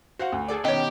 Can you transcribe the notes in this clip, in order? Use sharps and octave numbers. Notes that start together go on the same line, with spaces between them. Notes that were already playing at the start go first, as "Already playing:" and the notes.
F#4 C5 F5 F#5
D2
G#4 A4 D5
B2 D#3 B3 C#4 G4 C#5 D#5